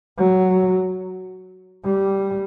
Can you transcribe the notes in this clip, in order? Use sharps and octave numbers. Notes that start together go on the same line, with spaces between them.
F#3
G3